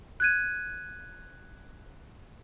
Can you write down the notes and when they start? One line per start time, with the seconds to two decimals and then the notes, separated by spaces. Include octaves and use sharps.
0.20 F#6 G#6 D#7